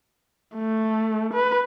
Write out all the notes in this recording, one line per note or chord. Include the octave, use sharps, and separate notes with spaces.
A3
B4